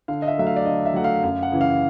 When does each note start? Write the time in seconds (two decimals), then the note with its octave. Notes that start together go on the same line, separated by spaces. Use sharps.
0.08 D3 F5
0.22 D#5
0.28 E5
0.38 F#3 A3 E5
0.46 F5
0.56 D5
0.65 D3 D#5
0.86 E5
0.94 F#3 A3 F#5
1.04 F5
1.23 F#2 F5
1.43 F#5
1.52 C#3 E3
1.61 F5